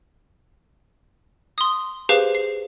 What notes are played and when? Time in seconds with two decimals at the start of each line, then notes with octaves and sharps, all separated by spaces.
1.58 C6 D#6
2.09 G4 G#4 B4 C5 F5
2.35 C7